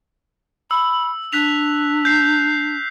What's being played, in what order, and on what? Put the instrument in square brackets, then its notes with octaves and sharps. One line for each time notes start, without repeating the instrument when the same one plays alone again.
[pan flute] B5 [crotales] E6
[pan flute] D4 [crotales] F#6 B6 F7
[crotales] G6 C7